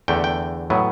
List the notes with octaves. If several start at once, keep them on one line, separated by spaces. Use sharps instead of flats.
E2 D3 A3 G5
G5
A2 F#3 B3